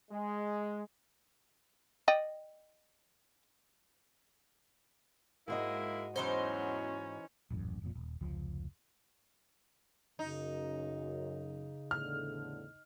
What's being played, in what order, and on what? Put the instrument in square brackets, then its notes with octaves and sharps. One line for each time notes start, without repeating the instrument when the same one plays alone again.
[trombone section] G#3
[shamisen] D5 D#5 G5
[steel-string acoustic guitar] G#2 F#4 D#5 [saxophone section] G#3 A#3 E4
[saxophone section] E2 F#3 [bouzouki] E3 D#4 C5 [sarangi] C#4
[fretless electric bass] D#1 A1 F#2
F1 F2 A#2
D#1
F1 C#2 F3
[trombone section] F#2 [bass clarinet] C#3 [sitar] D#4
[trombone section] E2 A2 D3 [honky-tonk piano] F6